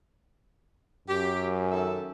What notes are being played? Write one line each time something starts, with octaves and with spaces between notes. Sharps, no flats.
F#2 G4
D#3 A4 E5